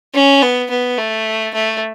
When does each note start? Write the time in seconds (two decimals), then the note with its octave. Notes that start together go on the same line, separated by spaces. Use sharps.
0.14 C#4
0.42 B3
0.70 B3
0.98 A3
1.54 A3